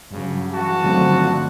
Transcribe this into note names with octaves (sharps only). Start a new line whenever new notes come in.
G2 C#3 F#3
E3 F#4 A5
D3 D#3 F3 F#3 A3 C4